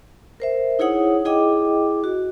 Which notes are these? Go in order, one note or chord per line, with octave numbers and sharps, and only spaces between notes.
A#4 C5 E5
D#4 E4 G#4 C#5 F#5 D#6
E4 G#4 D#5 G5 D6
F#4